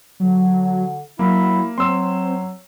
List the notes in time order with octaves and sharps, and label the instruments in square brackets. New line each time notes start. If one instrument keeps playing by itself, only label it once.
[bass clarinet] D3 [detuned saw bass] F#3
[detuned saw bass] F#3 [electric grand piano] A#3 [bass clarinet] E4
[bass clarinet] F#3 [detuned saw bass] C4 [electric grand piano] C6 E6